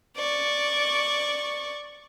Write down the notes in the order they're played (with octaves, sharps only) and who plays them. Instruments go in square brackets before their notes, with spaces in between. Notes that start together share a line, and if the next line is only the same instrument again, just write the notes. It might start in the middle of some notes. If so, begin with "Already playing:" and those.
[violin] D5 C#6